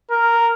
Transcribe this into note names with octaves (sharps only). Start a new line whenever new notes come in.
A#4